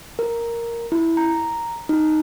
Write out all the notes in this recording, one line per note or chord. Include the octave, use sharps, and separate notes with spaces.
A#4
E4
A#5
D#4